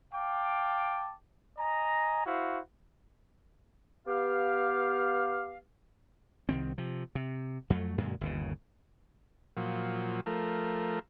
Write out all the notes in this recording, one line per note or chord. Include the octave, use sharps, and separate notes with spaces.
F5 G5 A5 D6
D#5 G#5 A#5
E4 F#4 C5 F5
B3 G4 F5
C2 D#3 C4
C3 F3
C3
F2 F#3 A3
F#2 A#2 D3 G#3
G1 D#2 C#3
A#2 F3 F#3
F3 A3 A#4